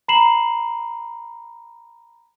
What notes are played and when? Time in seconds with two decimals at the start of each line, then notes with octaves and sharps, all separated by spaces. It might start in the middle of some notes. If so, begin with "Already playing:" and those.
0.08 A#5 B5 C7 E7 F#7